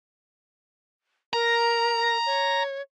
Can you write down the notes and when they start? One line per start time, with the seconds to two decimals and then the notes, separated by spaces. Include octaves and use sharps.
1.33 A#4 A#5
2.26 C#5